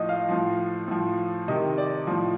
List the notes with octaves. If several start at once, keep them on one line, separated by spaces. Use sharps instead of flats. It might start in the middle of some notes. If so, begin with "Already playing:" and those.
Already playing: A2 F3 D#5
F5
A2 F3
A2 F3
C3 D#3 D#5
D5
A2 F3